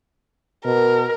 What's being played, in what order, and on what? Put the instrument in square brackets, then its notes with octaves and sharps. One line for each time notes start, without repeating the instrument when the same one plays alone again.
[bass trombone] B2 [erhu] A#4